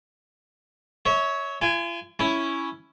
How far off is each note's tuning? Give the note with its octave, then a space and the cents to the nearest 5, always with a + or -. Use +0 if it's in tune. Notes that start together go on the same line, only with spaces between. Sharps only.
C#5 +10 E5 -30
F4 -45 G#5 +0
C#4 +0 E4 +0